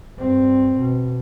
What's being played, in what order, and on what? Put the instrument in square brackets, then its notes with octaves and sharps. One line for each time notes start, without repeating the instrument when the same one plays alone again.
[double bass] G2 C4
B2